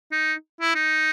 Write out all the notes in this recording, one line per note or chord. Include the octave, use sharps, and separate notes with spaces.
D#4
E4
D#4